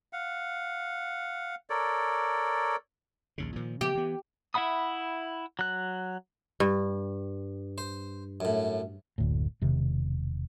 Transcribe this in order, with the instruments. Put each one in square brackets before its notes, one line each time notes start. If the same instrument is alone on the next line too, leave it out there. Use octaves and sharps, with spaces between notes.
[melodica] F5 F#5
A4 A#4 C#5 D5
[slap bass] A#1 D#2 C#3
A#2 D#3 F3
[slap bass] C#3 F3 B3 [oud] G4
[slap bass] E3 B3
[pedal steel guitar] E4 E5 F#5 B5 D#6
F#3 F#6
[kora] G2
[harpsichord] C5
F#2 A2
[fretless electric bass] F#1 D2 A2
E1 C3 D#3